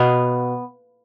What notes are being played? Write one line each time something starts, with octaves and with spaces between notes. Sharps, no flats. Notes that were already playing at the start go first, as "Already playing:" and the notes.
Already playing: B2 B3 F5